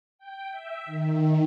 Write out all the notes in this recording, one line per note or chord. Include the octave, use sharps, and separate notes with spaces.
G5
E5
D#3